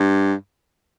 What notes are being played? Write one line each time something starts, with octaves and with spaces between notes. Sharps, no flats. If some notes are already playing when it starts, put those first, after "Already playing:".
Already playing: G2